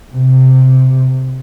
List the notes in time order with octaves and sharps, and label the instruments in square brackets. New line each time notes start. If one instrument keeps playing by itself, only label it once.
[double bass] C3